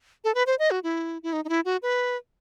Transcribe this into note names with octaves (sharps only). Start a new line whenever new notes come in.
A4
B4
C5
D#5
F#4
E4
E4
D#4
D#4
E4
F#4
B4